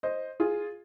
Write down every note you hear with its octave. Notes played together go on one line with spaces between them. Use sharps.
C5 D#5
F4 G#4